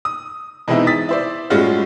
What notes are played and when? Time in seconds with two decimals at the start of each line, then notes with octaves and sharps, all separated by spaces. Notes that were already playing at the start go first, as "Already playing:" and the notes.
0.05 D#6
0.68 B2 E3 G#3 C4 D#4 E4
0.87 D#6 A6 B6
1.09 E4 C5 D5
1.50 A2 G3 G#3 C#4 F4 F#4